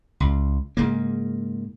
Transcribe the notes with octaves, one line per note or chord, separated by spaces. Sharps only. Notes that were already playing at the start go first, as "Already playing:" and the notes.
C#2
G#2 C#3 A#3